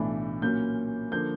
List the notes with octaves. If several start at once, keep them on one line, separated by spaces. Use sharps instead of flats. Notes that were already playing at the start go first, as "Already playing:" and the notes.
Already playing: B1 A2 E3 A3 D4
A#2 F#3 A#3 C#4 G6
D3 F3 A#3 G6